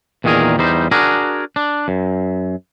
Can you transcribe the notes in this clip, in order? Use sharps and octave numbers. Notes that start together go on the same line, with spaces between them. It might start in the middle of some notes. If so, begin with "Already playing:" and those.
E2 A#2 D#3 D4 G#4 A#4
E2 G3 D#4 C5
D4 F#4 G#4 A#4
D4
F#2